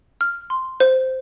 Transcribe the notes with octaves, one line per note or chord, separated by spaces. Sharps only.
F6
C6
C5